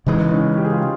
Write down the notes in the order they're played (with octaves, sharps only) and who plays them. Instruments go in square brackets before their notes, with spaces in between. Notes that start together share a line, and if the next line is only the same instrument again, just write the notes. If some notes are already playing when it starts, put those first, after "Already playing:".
[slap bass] C#3 E3 G#3 [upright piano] C#4 D#4
[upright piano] C#4 D#4
G4
G#4
F4 G4